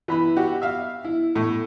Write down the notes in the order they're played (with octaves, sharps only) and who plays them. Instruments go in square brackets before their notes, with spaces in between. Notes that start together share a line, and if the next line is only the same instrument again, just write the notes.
[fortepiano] E3 B4 B5
F#4 G4
E5 F5
E4
A2